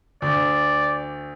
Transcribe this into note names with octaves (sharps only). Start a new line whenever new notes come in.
D2 D5